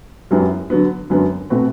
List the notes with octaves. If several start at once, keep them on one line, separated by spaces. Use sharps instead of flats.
F#2 F#3 B3 E4 G4
D3 F#3 B3
F#2 D3 F#3 B3
B2 A3 C4 F#4 B4